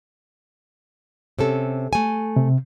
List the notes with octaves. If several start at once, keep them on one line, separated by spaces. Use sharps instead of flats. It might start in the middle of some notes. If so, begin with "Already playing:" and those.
C3 C#4 A4
A3 G#5
C3